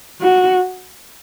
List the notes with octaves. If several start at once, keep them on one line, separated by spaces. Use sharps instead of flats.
F#4